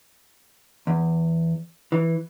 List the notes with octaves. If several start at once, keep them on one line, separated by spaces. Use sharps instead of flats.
E2
E3